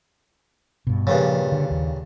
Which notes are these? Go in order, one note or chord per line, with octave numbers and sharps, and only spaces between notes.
G2 B2
G2 A#2 C#3 F3
D3
D#2